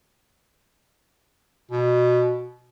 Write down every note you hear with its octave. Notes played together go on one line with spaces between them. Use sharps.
B2